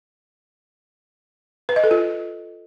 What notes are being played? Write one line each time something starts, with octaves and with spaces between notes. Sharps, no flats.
B4
D#5
A4
F4